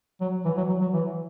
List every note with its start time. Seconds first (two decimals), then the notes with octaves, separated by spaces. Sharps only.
0.21 F#3
0.45 E3
0.57 F#3
0.69 F#3
0.81 F#3
0.94 E3